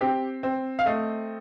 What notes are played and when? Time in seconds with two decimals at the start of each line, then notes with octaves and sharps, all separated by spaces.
0.01 C4 G4
0.43 C4
0.79 F5
0.86 A3 D#5